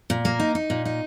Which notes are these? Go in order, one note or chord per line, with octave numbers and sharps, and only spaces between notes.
A#2
A#3
D#4
D#4
A#2
D#4